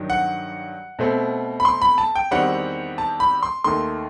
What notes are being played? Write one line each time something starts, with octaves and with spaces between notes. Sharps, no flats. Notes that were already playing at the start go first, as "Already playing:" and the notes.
Already playing: G2 D#3 F#3
F#5
B2 A3 C4
B5
C6
B5
A5
G5
E2 D#3 G3 C4 F#5
A5
B5
C6
D#2 D#3 A3 C6